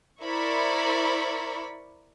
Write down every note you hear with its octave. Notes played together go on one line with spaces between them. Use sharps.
E4 A#4 C5 D5 B5 C#6